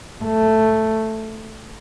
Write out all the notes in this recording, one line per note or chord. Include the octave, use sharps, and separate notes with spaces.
A3